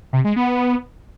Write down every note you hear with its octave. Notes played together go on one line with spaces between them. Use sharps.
C3
G#3
B3